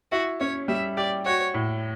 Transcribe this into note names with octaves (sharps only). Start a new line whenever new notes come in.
E4 F#4
C#4 C#5
G3 E5
G4 D5
F#4 C#5
A2